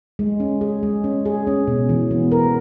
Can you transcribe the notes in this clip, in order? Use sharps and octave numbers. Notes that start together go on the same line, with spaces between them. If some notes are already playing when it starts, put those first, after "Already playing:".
G#3
C#4
G#4
G#3
C#4
G#4
C#4
B2
E3
B3
A#4